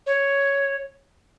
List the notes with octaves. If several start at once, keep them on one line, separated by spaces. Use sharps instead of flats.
C#5